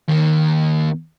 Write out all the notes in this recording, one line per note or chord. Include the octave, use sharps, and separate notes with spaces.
D#2 D#3